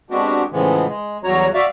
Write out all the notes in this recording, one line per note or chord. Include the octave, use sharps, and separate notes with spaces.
G#3 B3 C4 D4 F#4 G4
A2 C#3 E3 F3 G#3 B3
G#3
E2 F#3 G3 F#4 C#5 A#5
F#4 D5 E5 F5